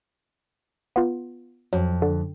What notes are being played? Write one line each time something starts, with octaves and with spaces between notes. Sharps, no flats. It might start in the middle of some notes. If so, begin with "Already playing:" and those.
B3 F4
F2 F#3
D3